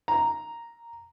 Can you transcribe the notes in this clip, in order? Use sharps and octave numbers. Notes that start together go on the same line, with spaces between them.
A#5